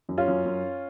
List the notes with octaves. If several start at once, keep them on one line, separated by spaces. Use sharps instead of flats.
F#2
C#4 F4
F#2
F#2